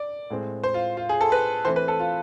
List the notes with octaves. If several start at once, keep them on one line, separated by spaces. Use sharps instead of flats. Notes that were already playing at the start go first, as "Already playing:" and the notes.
Already playing: D5
A2 G#3 C4
C5
F4
F4
G#4
A4
B4
E3 A3 C4 C5
B4
A4
F4